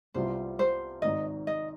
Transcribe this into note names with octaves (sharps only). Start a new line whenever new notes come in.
C2 C3 G3 B3 F4 C5
C5
G#1 G#2 D#3 D#5
D#5